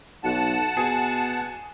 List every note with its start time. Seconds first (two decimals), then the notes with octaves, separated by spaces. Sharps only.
0.24 B1 F#5 A5
0.77 B2 G#4